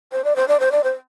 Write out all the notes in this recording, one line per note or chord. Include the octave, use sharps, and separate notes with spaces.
C5
D5
C5
D5
C5
D5
C5